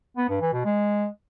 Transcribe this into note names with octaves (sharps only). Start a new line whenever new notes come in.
B3
G2
E3
B2
G#3